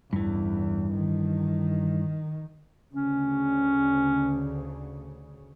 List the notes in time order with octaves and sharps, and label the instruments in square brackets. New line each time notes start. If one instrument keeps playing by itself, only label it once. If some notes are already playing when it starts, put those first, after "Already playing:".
[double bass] A1 E2 [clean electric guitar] G2 E3
[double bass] D#3
[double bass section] D2 C#3 [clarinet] C#4